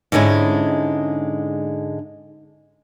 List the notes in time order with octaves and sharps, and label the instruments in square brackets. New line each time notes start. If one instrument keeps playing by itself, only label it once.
[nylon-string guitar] G#2 D3 G#3 C#4 E4